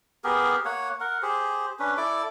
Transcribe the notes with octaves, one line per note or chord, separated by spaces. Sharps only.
B3 G4 G#4 A#4
A#3 C#5 F#5
A#4 F#5
G4 G#4 C5
C#4 D4 B4
E4 A4 D5 D6